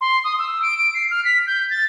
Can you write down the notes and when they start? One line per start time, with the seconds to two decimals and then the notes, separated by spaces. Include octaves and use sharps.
0.01 C6
0.24 D#6
0.39 E6
0.62 D7
0.78 D7
0.94 C7
1.10 F6
1.25 B6
1.47 G6
1.70 A6